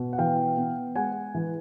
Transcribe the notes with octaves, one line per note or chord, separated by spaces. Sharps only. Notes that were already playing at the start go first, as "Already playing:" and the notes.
Already playing: B2
F#5
E3 F5 G5
B3
G#3 F#5 G#5
E3